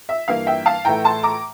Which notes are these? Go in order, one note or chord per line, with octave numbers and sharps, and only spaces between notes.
E5
G2 E3 A#3 F5
E5 G5
F5 A5
A2 E3 A3 G5 A#5
A5 C6
A#5 D6